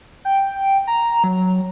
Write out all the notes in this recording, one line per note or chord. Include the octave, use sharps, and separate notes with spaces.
G5
A#5
F#3